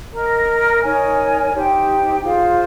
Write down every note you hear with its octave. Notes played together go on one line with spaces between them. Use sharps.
A#4 D#5 A#5
D#4 A#4 C#5 G#5
D#4 G4 C5 G5
F4 G#4 C5 F5